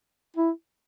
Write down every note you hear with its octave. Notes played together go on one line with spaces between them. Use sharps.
E4